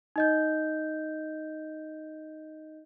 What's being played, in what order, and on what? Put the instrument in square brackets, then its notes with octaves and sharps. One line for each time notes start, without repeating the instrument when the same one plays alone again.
[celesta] D#4 D#5 G6